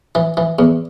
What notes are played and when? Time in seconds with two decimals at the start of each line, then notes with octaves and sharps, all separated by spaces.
0.15 E3
0.37 E3
0.59 E2